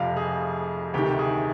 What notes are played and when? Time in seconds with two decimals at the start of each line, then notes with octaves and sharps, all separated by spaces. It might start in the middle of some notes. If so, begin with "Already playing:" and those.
Already playing: F1 F2 C3 F3 F5
0.16 G#4
0.94 D2 C3 D#3 G4
1.19 G#4